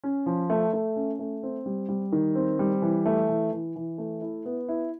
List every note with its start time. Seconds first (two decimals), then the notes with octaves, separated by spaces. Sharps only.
0.04 C#4
0.26 F3
0.50 A3
0.73 A3
0.96 C#4
1.19 A3
1.43 C4
1.66 G3
1.89 G3
2.12 D#3
2.35 C4
2.59 G3
2.82 E3
3.06 A3
3.29 E3
3.52 E3
3.76 E3
3.98 A3
4.21 E4
4.45 B3
4.69 E4